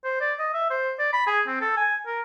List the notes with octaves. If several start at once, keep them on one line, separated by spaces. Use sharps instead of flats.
C5
D5
D#5
E5
C5
D5
B5
G#4
C4
A4
G#5
A#4